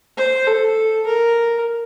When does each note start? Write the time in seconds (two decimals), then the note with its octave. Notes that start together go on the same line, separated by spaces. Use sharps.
0.17 C5
0.47 A4
1.06 A#4